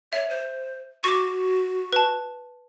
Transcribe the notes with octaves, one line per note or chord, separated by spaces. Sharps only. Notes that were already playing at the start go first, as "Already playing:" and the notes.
C#5 E5
C5
F#4 C#6 D6
B4 A5